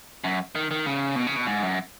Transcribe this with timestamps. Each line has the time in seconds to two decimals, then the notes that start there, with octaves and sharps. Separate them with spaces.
0.24 F#2
0.55 D#3
0.71 D#3
0.86 C#3
1.16 B2
1.27 C#3
1.36 B2
1.47 G#2
1.63 F#2